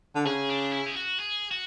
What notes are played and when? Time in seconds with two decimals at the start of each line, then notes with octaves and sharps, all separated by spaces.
0.15 D3
0.26 C#3 G#4
0.49 D4
0.72 E4
0.86 G#4
0.96 F#4
1.19 G#4
1.51 F#4